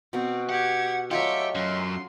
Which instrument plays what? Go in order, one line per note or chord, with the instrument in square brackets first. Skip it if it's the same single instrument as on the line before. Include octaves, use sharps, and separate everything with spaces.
[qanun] B2 F#4 [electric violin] C4
[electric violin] G4 G#6 [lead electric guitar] F#5
[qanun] F#3 A3 F4 [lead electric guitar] G4 [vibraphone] C#5 D#5 [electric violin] E5 C#7
[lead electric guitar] F#2 [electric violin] C6